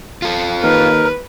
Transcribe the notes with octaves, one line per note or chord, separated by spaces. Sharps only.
F4 A4
D#2 A#4 B4